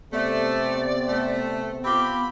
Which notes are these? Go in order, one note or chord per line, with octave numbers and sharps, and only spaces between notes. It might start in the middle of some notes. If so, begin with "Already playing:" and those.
C3 A3 B3 D5
A3
C4 F4 G4 B5